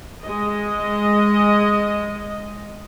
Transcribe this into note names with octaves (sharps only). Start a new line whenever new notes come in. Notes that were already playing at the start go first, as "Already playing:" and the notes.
G#3 D#5